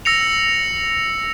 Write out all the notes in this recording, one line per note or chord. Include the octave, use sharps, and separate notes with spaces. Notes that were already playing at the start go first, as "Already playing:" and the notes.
E6 A#6 C#7 F7